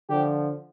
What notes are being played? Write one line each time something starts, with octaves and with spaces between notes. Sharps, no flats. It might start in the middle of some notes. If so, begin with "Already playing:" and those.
D3 F3 G4